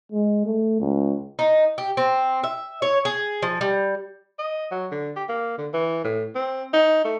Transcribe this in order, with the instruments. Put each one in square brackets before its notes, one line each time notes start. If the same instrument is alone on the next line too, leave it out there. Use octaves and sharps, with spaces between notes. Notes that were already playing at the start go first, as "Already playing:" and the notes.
[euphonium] G#3
A3
C#2
[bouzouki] D#4
G4
C4
E5
C#5
G#4
F3
G3
[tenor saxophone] D#5
F#3
D3
G4
A#3
D3
E3
A2
C4
D#4
A3